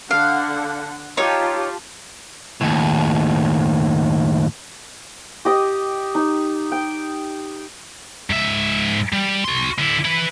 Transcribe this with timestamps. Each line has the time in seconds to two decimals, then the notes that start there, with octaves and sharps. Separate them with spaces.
0.11 D3 F5 F#5
1.17 D#4 F4 G4 C#5 A5
2.61 D#2 A2
5.45 G4 D#5
6.15 D#4
6.71 G5
8.30 G#2 E5
9.12 G3
9.44 F#4 C6
9.79 D3 E4
10.05 E4 B4